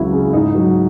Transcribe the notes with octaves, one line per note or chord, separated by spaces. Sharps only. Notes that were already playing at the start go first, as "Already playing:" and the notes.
Already playing: C#2 C#3 E3 F#3 E4 F#4
C#3
G#2 D#4
F#3